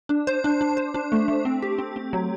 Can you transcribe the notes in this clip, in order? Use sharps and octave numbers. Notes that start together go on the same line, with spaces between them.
D4
C5
D4
D4
C5
D4
A3
A3
C4
G4
C4
C4
F#3